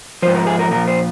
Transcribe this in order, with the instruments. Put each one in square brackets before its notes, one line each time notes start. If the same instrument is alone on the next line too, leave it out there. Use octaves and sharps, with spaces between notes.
[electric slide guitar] F3 C5
G#2
A#4
G#4
A#4
A#2 F3 A#4
C5